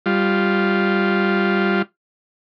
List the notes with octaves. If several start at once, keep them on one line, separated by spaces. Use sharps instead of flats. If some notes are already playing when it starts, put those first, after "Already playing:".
G3 F4